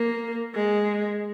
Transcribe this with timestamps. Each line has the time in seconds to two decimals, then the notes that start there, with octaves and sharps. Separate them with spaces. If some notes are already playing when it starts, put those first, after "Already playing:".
Already playing: A#3
0.55 G#3